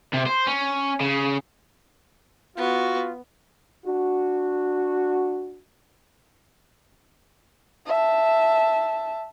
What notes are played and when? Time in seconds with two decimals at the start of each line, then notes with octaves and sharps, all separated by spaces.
0.14 C3
0.27 C5
0.47 C#4
1.01 C#3
2.57 B3 F4 F#4
3.85 D4 F#4
7.86 E5 A5